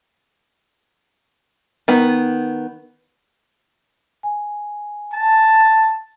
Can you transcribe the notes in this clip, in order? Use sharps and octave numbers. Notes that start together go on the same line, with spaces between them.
D#3 B3
G#5
A5